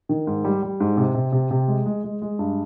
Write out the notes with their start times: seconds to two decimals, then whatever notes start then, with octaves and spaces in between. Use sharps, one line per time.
0.09 D#3
0.27 G#2
0.44 G3
0.63 G3
0.80 G#2
0.97 C3
1.15 C3
1.32 C3
1.51 C3
1.68 G#3
1.86 G#3
2.03 G#3
2.22 G#3
2.39 G2